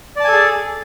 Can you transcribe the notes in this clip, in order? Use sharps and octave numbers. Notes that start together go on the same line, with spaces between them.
G#4 A4 D5 G#5 A5